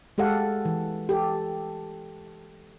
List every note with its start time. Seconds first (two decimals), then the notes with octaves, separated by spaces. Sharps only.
0.18 G#3 G4 A4 F5 F#5
0.65 E3
1.09 G4 A4